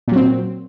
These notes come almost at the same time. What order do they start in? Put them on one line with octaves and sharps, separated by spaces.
A#2 F#3 C4